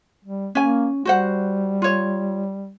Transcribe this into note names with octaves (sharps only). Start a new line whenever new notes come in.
G3
A#3 C#4 G#5
G3 F#4 C5 F#5
F4 C#5